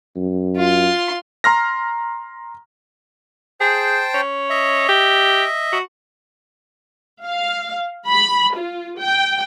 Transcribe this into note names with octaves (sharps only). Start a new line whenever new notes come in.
F#2
F4 C6
A#5 C6 F6 A#6
G#4 C5 G5 A5
C#4
D#5 E5
G4
F#4
F5
B5
F4
G5